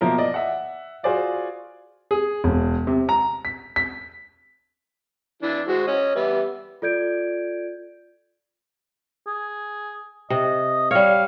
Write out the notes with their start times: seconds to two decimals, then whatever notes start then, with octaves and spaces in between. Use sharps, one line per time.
0.01 B2 F3 A#3 E4 A#4
0.18 D5 D#5
0.34 E5 F#5
1.03 F4 F#4 G#4 C5 D5 F5
2.11 G#4
2.44 E1
2.87 C3
3.09 A#5
3.45 B6
3.76 B6
5.42 E3 D4 E4
5.68 G#3 F#4 C5
5.87 C#4 D#5
6.16 G3 B3 E5
6.82 F4 A4 D5 G6 G#6 D7
9.27 G#4
10.30 C3 D#5
10.91 G3 C#5 F5